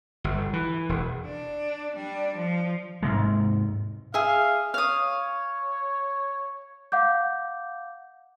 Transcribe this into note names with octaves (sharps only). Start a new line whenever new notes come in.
G1
E3
E1
D4
G3 D4
F3
G#2 C3 G#3
G#4 E5 F5
C#5 F5 D#6
F5 F#5 D6 G6